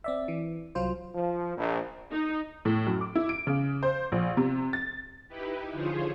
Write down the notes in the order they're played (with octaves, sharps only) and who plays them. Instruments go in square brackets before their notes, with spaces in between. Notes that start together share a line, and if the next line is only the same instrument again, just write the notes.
[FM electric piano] C4 D5 E5
E3
C2 F#3 F4 C5
[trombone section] F3
A#1
[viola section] D#4
[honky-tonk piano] A2
F#2
D6
E4
D7
C#3
C5
A#1
C3
A6
[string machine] D#4 E4 G4 B4
D3 F3 F4 G#4 C5 C#5